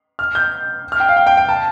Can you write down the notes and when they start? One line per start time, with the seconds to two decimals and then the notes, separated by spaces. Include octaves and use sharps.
0.19 F6
0.35 G6
0.92 F6
1.00 G5
1.09 F5
1.17 G5
1.27 G5
1.37 G5
1.49 A5